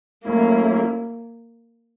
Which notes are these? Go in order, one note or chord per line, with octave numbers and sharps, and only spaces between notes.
F#3 A3 A#3 C#4 E4